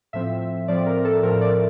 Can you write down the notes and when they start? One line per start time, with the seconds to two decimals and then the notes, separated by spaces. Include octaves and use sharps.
0.13 A2 F3 C4 E5
0.68 A2 F3 C4 D5
0.86 A#4
1.05 A4
1.23 A2 F3 C4 A#4
1.41 D5